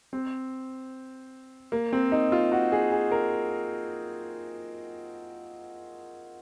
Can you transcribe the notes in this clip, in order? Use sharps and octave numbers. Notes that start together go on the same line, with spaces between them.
C4
A#3
C4
D#4
F4
F#4
G#4
G#4
A#4